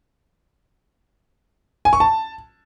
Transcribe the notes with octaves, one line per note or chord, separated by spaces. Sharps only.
G#5
C#6
A5